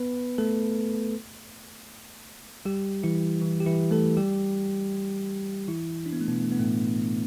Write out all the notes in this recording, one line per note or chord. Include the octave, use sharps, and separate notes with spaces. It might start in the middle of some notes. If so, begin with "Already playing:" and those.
Already playing: B3 B4
A3 A4
G3 G4
E3 E4
E3
G4
E3 E4
A3 A4
G3 G4
E3 E4
D4
B3
A3
B2 B3
A3
B3
A2 A3